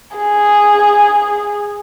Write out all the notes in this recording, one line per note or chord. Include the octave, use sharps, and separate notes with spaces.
G#4